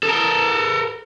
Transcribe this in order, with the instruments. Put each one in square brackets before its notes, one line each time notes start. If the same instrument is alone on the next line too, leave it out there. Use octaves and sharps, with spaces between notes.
[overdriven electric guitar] A4 A#4